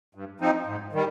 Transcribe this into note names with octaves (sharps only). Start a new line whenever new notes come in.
G2
F3 C4 D#4
G#2
D#3 G3